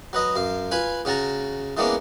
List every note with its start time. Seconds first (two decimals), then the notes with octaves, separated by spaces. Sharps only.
0.13 F#3 B4 D#5
0.36 F#2 F5
0.71 F4 B4 G#5 B5
1.05 C#3 C#4 F#4 A5 A#5
1.77 E3 G#3 A#3 B3 C#4 D4